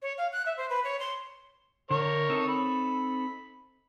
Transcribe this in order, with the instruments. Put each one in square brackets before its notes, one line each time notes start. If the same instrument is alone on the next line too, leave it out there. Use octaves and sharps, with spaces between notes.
[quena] C#5
F5
F#6
E5
C5
B4
C#5
C6
[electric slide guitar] D3 [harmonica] A#4 C#5
[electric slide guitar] C4 D#4 A4
[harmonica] B5